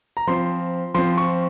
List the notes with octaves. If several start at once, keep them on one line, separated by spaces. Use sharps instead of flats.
A#5
F3 C4 C6
F3 C4 C6
C#6